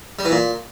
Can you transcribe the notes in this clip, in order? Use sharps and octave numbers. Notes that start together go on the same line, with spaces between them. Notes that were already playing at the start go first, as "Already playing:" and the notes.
G3
E3
A#2